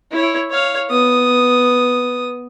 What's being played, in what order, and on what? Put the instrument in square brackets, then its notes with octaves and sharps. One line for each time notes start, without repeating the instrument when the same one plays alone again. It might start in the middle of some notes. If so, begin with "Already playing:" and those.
[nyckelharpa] E4 C#5
C#5 F5
B3 D#6